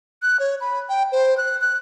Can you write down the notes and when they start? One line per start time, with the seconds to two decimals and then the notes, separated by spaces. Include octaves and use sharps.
0.22 F#6
0.40 C#5
0.61 B5
0.89 G5
1.12 C5
1.37 F#6
1.61 F#6